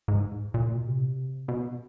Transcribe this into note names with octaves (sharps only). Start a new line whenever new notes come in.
G#2
A#2
B2
C3
B2